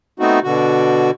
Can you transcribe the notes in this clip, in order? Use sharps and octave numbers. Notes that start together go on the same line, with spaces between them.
A3 B3 C4 D#4 F#4
B2 D3 F#4